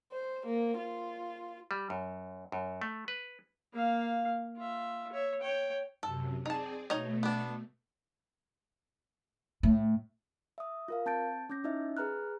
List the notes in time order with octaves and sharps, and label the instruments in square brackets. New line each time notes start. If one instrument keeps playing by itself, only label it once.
[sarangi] C5
A#3
F4
[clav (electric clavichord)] G3
F#2
F#2
A3
B4
[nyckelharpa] A#3 F5
F4 E5
C#5 E5
C#5 G5
[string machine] F#2 C3 [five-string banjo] A4
[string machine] C4 G#4 D5 [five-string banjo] D#4 A5
[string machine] B2 A3 [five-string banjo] D#4 C#5 D#5
[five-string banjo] B3 D4
[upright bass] A2
[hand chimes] E5 D#6
F4 A#4 F5
C4 A5 G6 A6 D7
C#4 D6 G6 A#6
C#4 D#4 E4 D#5 E5
G#4 B4 A#5 F6 F#6